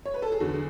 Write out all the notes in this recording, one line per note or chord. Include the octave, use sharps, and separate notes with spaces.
C#5
B4
A4
G#4
E2 D3 F#3 F#4